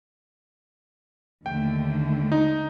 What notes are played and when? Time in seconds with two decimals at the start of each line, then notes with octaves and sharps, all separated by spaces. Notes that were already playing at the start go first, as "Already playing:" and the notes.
1.46 D#2 D3 A3 G5
2.32 D#4